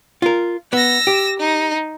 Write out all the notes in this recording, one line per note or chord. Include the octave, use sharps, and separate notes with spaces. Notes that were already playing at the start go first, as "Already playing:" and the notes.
F4 A#4
B3 E6 A#6
G4
D#4